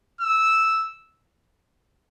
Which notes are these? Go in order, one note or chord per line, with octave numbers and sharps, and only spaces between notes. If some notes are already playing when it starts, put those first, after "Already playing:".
E6